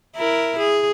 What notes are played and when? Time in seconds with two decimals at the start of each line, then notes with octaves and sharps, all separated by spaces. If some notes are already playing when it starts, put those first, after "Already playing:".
0.16 E4 A#4
0.59 G#4